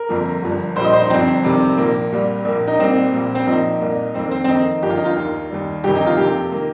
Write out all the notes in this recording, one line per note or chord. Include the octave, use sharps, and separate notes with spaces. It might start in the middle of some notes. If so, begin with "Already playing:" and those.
Already playing: A#4
G1 F2 F3 A#3
G1 G2 F3
A#1 A#2 G3 C5
D#5
C5
D#4
G1 G2 F3 C4
F2 C3 D#3 G3
A#1 A#2 F3 A#3
C2 A#2 G3 A#3
A#1 A#2 A#3
D#4
C2 A#2 G3 A#3 C4
A#1 A#2 G3 A#3
C4
A#1 A#2 F3 A#3 D#4
C2 A#2 A#3
F2 D#3 A#3 C4
C4
C4
F2 D#3 A#3 D#4
G1 G2 F3 A#3 G4
F4
D#4
F4
D#2 D#3 A#3
D#2 D#3 G3
G1 F2 C3 D#3 G4
D#4
F4
F2 C3 F3 A#3 G4
D#3 A#3